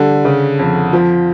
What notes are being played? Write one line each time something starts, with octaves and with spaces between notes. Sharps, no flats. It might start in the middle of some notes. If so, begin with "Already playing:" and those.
Already playing: D3 G3
C#3
F2
F3